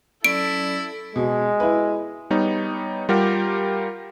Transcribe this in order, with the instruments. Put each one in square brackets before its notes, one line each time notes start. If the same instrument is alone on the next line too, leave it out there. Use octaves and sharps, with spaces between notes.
[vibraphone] F#3 C#4 D5 [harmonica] E4 [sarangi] A4 [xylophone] D7
[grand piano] B2 [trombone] G#3
[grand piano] E4 B4
[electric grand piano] G3 B3 D#4 C#5
G3 F4 G4 A#4 F#5